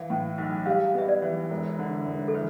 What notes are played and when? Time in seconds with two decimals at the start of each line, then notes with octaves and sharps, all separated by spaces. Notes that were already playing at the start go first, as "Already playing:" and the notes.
Already playing: E3 F5
0.10 A2
0.38 B1
0.66 G3 F5
0.94 B3 E5
1.08 D5
1.22 E3
1.50 E1
1.79 D3
2.07 E1
2.28 A4
2.34 E3 B4